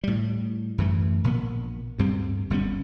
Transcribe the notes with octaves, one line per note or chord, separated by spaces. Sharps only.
A2 G3
F#2 E3 A3
A#1 A#2 A#3 B3
D2 G2 G3 C4
F#1 G3 B3 C#4